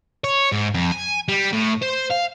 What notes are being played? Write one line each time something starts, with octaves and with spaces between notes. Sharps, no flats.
C#5
G#2
F2
G#5
G3
A2
C5
F5